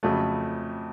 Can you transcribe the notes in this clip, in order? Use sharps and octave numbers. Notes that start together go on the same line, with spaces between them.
F2 C#3 F#3 A3